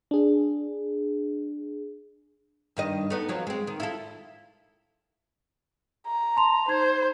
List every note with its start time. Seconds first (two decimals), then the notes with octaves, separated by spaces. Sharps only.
0.11 D4 G#4
2.77 G2 D#3 D#5
3.10 A3 B3 D#4
3.29 F3 F#3 C4
3.47 G#3 C4
3.67 D#3
3.80 E4 F4 A4
6.06 A#5
6.36 A5 C6 F7
6.68 D#4 C5 G#6